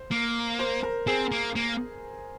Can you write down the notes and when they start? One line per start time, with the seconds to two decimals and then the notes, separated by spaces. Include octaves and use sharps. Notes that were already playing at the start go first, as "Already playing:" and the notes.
Already playing: C5
0.11 A#3
0.59 C5
0.83 A#4
1.07 C4 G#4
1.32 A#3
1.56 A#3